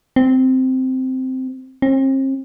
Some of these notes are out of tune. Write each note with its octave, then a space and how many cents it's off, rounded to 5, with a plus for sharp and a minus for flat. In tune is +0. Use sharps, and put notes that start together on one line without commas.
C4 -10
C4 +40